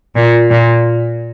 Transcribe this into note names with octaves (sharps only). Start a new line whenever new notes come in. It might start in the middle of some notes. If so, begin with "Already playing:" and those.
A#2
A#2